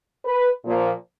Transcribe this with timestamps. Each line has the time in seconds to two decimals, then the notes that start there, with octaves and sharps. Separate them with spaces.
0.25 B4
0.64 A#2 F3 A#3